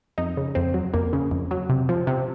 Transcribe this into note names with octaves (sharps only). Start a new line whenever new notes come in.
F2 D#4
C#3
F2 C4
F#3
F2 A#3
C#3
F2
F#3
C3
F3
C3